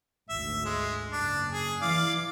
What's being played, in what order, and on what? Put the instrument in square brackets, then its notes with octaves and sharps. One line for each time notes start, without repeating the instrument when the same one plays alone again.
[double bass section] G#1 D2 [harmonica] E5
[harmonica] G#3
[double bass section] F#1 [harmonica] D4
[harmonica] G#4
[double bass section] E3 [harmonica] D5 F5